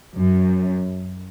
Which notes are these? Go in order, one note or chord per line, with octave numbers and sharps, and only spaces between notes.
F#2